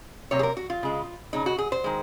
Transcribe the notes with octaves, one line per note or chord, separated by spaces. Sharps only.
C3 F#3 A#3 C#5
G#4
A#4
F#4
F4
C#3 G#3
C#3 G#3 D#4
F#4
G#4
C5
D#3 G#3